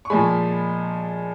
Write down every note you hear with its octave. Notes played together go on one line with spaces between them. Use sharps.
C#6
A#2 F3 G#3 G#5 B5